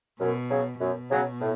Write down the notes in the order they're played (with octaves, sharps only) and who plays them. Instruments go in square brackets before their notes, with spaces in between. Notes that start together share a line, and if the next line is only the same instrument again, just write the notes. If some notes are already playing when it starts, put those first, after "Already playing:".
[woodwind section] F#2 [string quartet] B2
[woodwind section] C#3 F#3
[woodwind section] F#2 [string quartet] B2
[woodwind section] C#3 F#3
A2